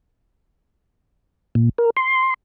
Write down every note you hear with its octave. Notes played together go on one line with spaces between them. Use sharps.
A#2
A#4
C6